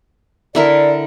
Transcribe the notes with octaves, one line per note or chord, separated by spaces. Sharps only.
D3 E4 A#4 D5